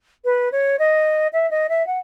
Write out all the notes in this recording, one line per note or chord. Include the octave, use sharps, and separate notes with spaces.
B4
C#5
D#5
E5
D#5
E5
F#5